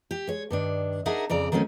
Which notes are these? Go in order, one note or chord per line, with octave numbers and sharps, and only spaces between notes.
G4
G#3 C#5
G2 D#3 D4
D4 D#4 G#4 A#4 E5 F#5
F2 C#3 D5 A#5
D#3 F#3 A3 C4 C#4